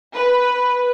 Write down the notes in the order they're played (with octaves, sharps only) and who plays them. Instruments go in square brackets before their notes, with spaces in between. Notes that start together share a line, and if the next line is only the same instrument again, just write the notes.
[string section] B4